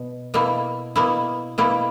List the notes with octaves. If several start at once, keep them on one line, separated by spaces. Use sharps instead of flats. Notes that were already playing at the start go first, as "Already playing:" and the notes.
Already playing: B2
B2 A#3 E4
B2 A#3 E4
B2 A#3 E4